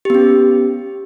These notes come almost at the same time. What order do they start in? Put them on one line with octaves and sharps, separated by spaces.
G4 B3 C#4